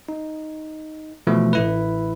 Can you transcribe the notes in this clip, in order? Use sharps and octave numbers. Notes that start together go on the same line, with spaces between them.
D#4
B2 E3 F3 A3
A1 E4 B4